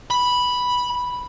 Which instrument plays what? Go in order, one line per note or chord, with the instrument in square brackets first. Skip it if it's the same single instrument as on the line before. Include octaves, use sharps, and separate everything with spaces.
[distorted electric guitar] B5